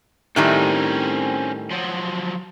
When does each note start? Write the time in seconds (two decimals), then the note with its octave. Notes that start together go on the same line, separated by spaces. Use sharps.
0.36 A2 D#3 G3 C4 C#4
1.71 F3 F#3